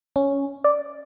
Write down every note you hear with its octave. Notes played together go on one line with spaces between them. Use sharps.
C#4
D5